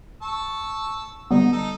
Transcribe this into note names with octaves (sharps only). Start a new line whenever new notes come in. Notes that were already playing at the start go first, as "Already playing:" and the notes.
A5 C#6 E6
D3 G3 B3 D#4
D#4 A4